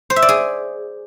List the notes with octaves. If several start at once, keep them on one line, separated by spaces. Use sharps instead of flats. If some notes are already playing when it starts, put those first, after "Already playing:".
C5
E5
D5
G#4